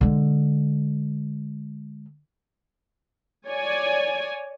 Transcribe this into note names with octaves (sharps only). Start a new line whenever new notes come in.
D3 G#3
C#5 D5 G#5